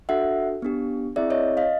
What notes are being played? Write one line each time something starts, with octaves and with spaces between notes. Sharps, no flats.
D4 F#4 A4 E5 F#5
B3 D4 G4
C4 E4 G#4 D5 E5
C#5 D#5
D#5 F5